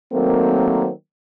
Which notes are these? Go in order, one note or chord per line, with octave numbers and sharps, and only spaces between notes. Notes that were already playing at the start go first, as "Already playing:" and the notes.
D#3 F#3 A3 A#3 C4